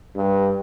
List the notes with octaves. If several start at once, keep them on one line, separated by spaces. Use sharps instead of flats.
G2